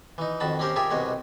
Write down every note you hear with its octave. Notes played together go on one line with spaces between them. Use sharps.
E3 D#4
F2 D#3 F#4 A5 B5
A#3 C4 C#4 G4 A#4 C5
F4 G4 G#4 A#4 E5
C2 B2 G#3 F#4 C#5